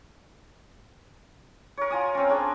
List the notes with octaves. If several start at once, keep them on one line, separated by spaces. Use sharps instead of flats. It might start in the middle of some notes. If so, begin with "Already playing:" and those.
A#4 C#5
F4 G#5 D#6
C4 C#4
C#4 D4 G#4